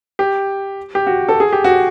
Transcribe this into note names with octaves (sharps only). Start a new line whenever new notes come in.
G4
G4
F#4
A4
G#4
G4
F#4